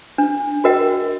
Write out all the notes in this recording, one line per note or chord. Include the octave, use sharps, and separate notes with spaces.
D4
F#4 A#4 D#5 G5